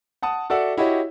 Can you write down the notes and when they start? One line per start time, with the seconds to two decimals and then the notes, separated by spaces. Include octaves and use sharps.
0.22 F#5 A5 D#6
0.50 F#4 A4 D5 E5 F#5
0.77 E4 F#4 G4 C#5 D#5